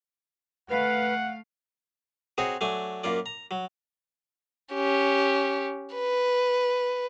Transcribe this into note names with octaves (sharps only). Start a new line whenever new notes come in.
A3 B4 F5 F#5
C4 D#4 F#4 G#4 C5 C#5
F#3 A3 D4 G#5
F#2 A#3 F4 D5
A#5
F#3
C#4 G4
B4